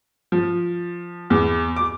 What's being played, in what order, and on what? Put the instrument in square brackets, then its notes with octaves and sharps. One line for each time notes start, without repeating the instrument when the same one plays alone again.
[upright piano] F3
E2
D6